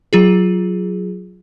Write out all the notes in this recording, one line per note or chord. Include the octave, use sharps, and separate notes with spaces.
F#3 F4 G#4